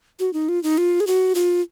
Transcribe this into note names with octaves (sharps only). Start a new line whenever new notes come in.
F#4
D#4
F4
D#4
F4
G#4
F#4
F4